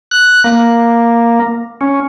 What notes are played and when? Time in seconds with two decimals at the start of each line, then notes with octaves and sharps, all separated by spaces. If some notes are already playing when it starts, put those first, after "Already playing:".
0.11 F#6
0.44 A#3
1.81 C#4